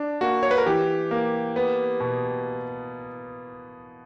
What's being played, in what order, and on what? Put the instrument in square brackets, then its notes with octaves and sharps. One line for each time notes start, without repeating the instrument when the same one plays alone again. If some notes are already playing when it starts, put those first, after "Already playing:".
Already playing: [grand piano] D4
[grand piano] A#3 [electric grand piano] F#4
[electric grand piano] C#5
B4
A#4
[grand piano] E3 [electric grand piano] G4
[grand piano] A#3
B3
B2